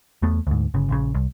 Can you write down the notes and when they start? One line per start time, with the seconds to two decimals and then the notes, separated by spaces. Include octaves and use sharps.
0.22 E2 A3 B3
0.47 D2 G#2
0.74 G1 C#3
0.90 A#1 C#3
1.14 C2